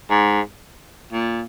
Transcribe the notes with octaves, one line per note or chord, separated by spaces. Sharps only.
G#2
A#2